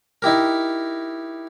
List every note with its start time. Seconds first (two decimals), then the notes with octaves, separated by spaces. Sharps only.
0.22 D#4 E4 G4 A#4